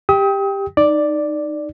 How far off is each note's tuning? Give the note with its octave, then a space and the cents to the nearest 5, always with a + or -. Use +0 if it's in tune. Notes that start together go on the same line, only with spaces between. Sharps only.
G4 +10 G5 +10 D#6 +35
D#4 -15 D5 +0